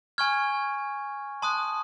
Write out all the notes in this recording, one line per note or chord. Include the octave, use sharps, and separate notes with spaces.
G#5 C#6 F6 G#6
A5 C6 D#6 F#6